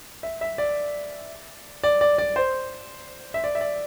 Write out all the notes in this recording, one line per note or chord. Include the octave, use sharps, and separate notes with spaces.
E5
E5
D5
D5
D5
D5
C5
E5
D5
E5
D5